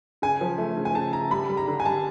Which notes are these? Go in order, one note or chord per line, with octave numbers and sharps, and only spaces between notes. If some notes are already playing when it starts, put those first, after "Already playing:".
C#3 G#5
F3
A3
C#3
G#5
C#3 A5
C#3 A#5
G3 B5
G3
A#5
D3
G#5
G3 A5